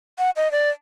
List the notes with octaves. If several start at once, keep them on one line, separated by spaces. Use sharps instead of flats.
F#5
D#5
D5